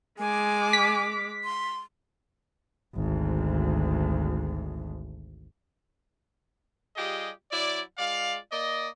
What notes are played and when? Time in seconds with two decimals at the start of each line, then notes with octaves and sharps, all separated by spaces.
0.19 G#3 G#5 D6
0.73 B6
1.44 C6
2.96 G#1 D2
6.96 G3 F4 G4 G#4 D#5
7.51 F#3 E4 D5
7.98 G#3 F4 D5 F5
8.52 A#3 D5 D#5